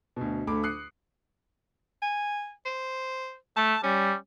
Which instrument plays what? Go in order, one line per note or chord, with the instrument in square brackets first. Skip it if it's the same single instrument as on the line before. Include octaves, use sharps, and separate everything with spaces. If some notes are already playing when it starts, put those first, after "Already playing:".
[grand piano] D2 B2
D2 A3 B5 D6
D#6 F#6 C7 C#7
[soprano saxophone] G#5
C5
[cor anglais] A3 [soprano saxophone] A5
[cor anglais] G3 [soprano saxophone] C#4